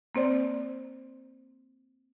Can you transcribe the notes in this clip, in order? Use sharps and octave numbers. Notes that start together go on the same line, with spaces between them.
A#3 C4 C5 D5